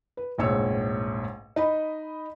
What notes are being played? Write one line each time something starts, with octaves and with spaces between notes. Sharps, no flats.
B4
F1 A#1 G#2 C#5 E6
D#4 D#5 B5